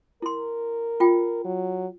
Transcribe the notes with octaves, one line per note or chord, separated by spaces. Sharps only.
E4 A#4 C6
F4 G5
F#3